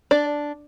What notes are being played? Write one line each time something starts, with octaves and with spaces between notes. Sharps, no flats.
D4 D5